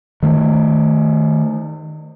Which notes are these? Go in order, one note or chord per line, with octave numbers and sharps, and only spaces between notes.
D#3 A3